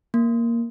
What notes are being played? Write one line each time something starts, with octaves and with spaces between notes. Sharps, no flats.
A#3